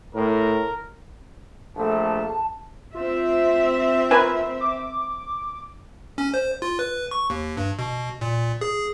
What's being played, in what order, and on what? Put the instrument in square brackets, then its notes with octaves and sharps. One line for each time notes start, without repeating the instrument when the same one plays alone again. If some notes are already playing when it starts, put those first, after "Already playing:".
[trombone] A2 [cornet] A#4
[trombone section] A#1 A3 [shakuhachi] A5
[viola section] C4 E5 [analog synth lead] F4
[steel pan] A#4 B4 G#5
[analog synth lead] D6
[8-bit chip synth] C#4
C5
F4
B4
C#6
D#2
G2
B2
A#2
G#4